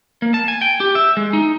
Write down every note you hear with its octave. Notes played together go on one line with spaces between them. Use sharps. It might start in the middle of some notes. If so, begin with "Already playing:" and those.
A#3
A5
G#5
G5
G4
E5
G#3
D#4